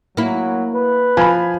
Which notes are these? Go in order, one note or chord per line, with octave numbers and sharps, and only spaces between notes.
F#3 A#3 E4
B4
F3 G#5 B5